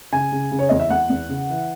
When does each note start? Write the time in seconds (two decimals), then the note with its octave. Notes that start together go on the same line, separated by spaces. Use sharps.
0.12 C#3 G#5
0.32 C#3
0.51 C#3
0.59 C#5
0.69 E2 D#5
0.80 E5
0.90 E2 F#5
1.10 E2
1.29 C#3
1.50 E3